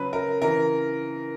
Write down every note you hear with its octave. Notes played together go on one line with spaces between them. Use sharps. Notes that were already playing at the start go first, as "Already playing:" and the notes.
Already playing: C#3 F#3 B4
A#4
C#3 E3 A#4